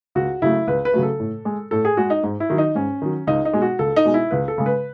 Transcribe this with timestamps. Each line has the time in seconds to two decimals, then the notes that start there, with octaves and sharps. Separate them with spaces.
0.15 C#2 F#4
0.42 C#3 F#3 A3 E4
0.67 C#2 B4
0.85 B4
0.93 C#3 F#3 A3
1.03 A4
1.20 A2
1.45 G#3
1.71 A2 A4
1.85 G#4
1.97 G#3 F#4
2.10 D#4
2.23 G#2
2.40 E4
2.50 D#3 F#3
2.58 D#4
2.75 G#2 C#4
3.02 D#3 F#3
3.27 C#2 D#4
3.45 D#4
3.53 B2 G#3
3.62 F#4
3.79 C#2 A4
3.96 D#4
4.05 B2 G#3
4.14 E4
4.31 C#2 B4
4.48 A4
4.58 C#3 G#3
4.66 B4